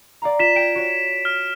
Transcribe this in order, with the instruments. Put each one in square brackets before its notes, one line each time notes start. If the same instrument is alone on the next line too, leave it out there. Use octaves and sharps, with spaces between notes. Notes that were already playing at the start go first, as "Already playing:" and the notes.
[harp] D5 F5 A#5
[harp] F4 [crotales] B6 E7
[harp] G5 G#6 [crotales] D7 E7
[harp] F#4 C#5
[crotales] F6